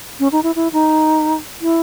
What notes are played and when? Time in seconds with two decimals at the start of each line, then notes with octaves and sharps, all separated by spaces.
0.20 C#4
0.32 D#4
0.43 E4
0.56 E4
0.73 D#4
1.62 E4